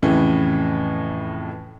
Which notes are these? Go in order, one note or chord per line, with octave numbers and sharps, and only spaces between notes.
F2 A2 C#3 E3